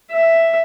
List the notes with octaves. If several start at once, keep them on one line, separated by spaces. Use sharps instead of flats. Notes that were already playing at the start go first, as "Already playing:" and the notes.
E5